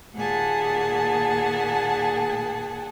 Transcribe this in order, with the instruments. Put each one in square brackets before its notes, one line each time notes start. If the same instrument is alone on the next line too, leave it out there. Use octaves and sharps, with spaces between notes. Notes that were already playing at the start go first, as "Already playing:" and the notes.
[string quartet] D#2 A#2 G#4 F#5 G#5 A5